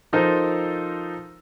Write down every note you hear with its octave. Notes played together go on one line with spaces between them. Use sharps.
F3 D#4 A4 A#4 C5